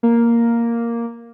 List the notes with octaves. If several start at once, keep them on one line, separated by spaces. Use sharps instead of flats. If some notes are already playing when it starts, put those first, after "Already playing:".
A#3